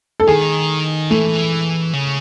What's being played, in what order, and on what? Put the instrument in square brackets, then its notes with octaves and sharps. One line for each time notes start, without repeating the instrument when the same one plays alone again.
[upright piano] A4
[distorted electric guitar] D#3 [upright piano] G#4
[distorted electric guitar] E3 [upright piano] A3
[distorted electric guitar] C#3